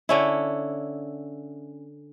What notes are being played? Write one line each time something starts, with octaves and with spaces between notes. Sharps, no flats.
D3 C#4 E4